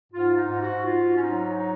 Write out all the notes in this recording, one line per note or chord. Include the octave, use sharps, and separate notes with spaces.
G#2 F4
D#4
G#2
F#4
G#2 F4
C#4
F#3 D#4
D#4